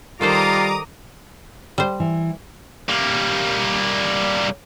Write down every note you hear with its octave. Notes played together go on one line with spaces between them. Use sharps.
D#3 G3 F4 A4 C5 A#5 D6 D#6
G3 C5
E3
G3 A#3